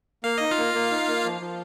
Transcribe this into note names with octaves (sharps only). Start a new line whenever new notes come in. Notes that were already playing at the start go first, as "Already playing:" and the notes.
A#3 F5
D#4 D#5
F4 F5
A#3
A#3
D#4
A#3
F3
F3